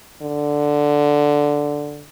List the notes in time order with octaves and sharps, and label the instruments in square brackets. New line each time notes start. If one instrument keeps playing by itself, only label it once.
[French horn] D3